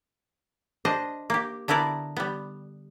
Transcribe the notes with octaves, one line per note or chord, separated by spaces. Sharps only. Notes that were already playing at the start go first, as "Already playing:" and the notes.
D4 C5 D#5
A#3 G4
D3 B3 E4 A#4 D5
G3 B3